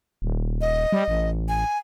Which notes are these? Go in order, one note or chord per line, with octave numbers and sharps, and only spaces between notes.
D#1
D#5
G3
A1
G#5